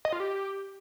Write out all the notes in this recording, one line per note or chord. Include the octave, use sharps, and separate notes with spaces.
D#5
F4
G4